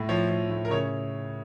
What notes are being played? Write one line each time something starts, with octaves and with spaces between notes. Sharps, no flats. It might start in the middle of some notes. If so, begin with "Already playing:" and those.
Already playing: A2
F3 C#5
F3
A2
A#4
C#3 C#5